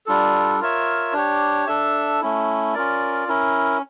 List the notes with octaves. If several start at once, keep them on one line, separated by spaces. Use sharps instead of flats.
G3 D4 F4 A4
F4 A#4 C#5 E5
D4 G4 C#5
D4 A4 E5
A3 C#4 E4
C#4 F4 A#4 D5
C#4 E4 A#4